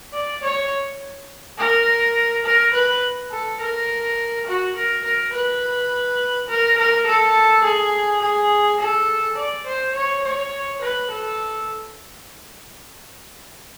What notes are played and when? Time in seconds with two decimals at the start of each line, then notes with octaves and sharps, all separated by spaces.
0.14 D5
0.43 C#5
1.58 A#4
2.45 A#4
2.74 B4
3.32 A4
3.60 A#4
4.47 F#4
4.76 A#4
5.04 A#4
5.34 B4
6.49 A#4
6.78 A#4
7.07 A4
7.64 G#4
8.22 G#4
8.80 A4
9.38 D5
9.67 C5
9.95 C#5
10.24 C#5
10.82 B4
11.11 A4